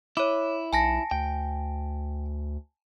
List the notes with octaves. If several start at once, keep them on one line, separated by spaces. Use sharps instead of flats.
E4 C#5 D6
B1 G#5 A5 A#6
D2 G5